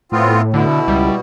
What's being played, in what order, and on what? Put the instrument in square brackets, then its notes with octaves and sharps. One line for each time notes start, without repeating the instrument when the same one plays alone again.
[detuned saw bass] A2 [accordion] B3 C4 F4
[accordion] B2 [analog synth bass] D3 [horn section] E4
[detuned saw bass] C#2 [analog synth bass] G3